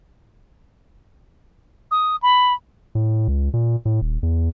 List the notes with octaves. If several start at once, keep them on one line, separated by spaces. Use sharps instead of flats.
D#6
B5
A2
C#2
A#2
A2
D#1
E2